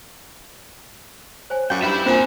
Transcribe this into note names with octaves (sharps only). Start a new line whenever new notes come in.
C5 C#5 G#5
F#2 D5 F5 G5
G2 E5 B5
A#2 C4 C5 E5 G#5